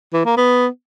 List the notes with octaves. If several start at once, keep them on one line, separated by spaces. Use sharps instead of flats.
E3
A#3
B3